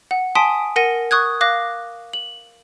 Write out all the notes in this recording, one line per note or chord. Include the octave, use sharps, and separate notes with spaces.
F#5
G#5 A5 C6 D#6 B6 D7
A#4 F#5 A#6 D#7
C#6 D#6 F#6 G#6
F5 D6 F#6 A#6
F#7